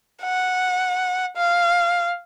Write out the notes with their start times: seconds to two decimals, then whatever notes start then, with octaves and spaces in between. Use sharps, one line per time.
0.23 F#5
1.37 F5